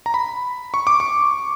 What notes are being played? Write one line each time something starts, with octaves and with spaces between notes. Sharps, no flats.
A#5
B5
C#6
D6
C#6